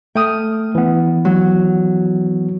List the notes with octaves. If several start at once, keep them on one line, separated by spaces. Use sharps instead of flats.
A3 G5 D#6 F6
E3 B3
F#3